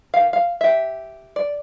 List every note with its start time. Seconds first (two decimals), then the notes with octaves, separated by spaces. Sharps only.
0.14 D#3 G4 F5
0.33 F5
0.61 G4 E5
1.36 D5